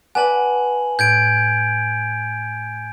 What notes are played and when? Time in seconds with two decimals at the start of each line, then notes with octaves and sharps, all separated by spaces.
0.15 B4 D5 F#5 G#5 A5 F#7
0.99 A2 G6 G#6 D7